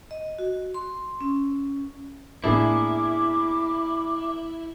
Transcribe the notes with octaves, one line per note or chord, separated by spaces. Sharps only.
D#5
F#4
C6
C#4
A2 A#3 B3 D4 E4 G#4 D6